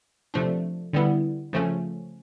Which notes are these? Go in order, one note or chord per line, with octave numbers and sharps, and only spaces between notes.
C3 F3 A3 D4
D3 G3 B3 E4
C#3 F3 A3 C#4